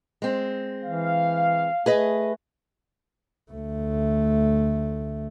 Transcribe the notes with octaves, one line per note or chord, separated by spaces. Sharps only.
G#3 C4
E3 F5
A3 G#4 B4 D#5
D2 A3